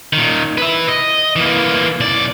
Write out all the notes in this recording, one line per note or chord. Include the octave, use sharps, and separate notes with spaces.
A#2 D#3
B4 E5
D#5
E3 A#3
B1 D5